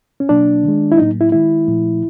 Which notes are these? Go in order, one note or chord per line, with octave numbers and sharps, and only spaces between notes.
C#4
B2 F#3 A#3 D4
D#3
G#3
E4
A2 F#3 A#3 D#4
E4
D#3 G#3 E4
A#2 F3 A3